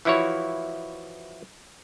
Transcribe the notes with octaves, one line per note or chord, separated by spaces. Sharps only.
E3 F3 E4 F#4 C#5